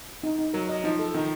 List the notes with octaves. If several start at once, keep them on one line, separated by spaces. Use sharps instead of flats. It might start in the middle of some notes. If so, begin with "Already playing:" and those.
D#4
D#4
F#3 A#4
D#5
F3 D#4
A4
D#3 D#4